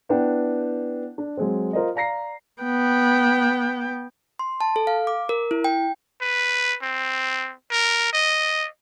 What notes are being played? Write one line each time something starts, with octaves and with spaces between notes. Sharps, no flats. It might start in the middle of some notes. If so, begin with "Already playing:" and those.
B3 D4 E4 B4 F#5 G5
D4
F#3 G#3 C4
F4 A#4 C5 D#5
D5 F5 A#5 A#6 C7
B3 G5
C6
A5
A4
F5
D6
A#4
E4
G5
B4
C4
A#4
D#5